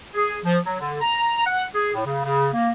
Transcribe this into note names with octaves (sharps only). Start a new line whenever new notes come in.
G#4
F3
F#3
D3
A#5
F#5
G#4
A2
C#3
C#3
A#3